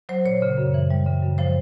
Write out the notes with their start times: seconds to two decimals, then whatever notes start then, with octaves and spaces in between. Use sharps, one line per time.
0.09 F#3 C5
0.25 A#2 C#5
0.42 C#3
0.58 F#2
0.74 E3
0.90 G3
1.06 C#3
1.23 F#2
1.38 F3 C5